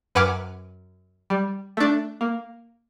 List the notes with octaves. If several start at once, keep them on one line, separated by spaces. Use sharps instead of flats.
F#2 B4 F#5 G#5 D6 F6
G3
A3 D4
A#3